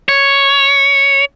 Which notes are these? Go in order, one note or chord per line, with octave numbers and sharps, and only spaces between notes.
C#5